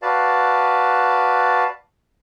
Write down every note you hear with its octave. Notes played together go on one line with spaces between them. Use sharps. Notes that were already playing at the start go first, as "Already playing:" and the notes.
F#4 B4 D5 F5 A5